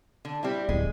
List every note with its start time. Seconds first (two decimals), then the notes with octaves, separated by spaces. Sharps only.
0.25 D3
0.43 G3 C4 E4
0.69 D1 G#3